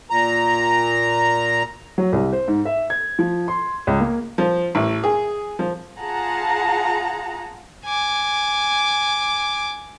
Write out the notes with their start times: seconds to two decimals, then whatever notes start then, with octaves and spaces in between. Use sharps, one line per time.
0.10 A#2 A#5
1.98 F#3
2.13 C2
2.33 C5
2.48 G#2
2.65 E5
2.90 G#6
3.19 F3
3.48 C6
3.87 C#2
4.00 A#3
4.38 F3
4.75 A1
5.04 G#4
5.59 F3
5.99 F4 G#4 F#5 A5 A#5
7.85 G#5 D6